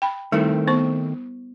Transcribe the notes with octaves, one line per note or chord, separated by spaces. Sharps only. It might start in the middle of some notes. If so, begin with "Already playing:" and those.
G5 B5
D#3 G3 A3 C4 E4 A#4
B3 C5 C#6